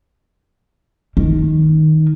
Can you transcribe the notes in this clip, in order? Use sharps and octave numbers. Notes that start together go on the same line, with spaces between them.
D#3